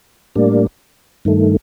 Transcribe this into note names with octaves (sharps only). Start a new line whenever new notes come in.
A2 G3 A#3 D4
G2 D#3 A3